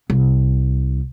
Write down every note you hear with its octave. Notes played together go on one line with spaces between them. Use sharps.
C2